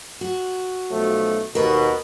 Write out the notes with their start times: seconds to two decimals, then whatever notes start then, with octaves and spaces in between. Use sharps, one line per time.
0.21 F#4
0.92 B1 F3 A3
1.55 D#2 B2 A#4 B4